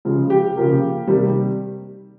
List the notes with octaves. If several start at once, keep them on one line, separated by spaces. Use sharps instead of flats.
C#3 F3 G#3
G4
C#3 F3 A#3
C3 D#3 G3